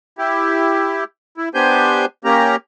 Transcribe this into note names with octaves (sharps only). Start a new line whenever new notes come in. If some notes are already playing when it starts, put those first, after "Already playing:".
E4 G4
E4
B3 D4 G4 C5 G#5 G6
A#3 C#4 G4 A#5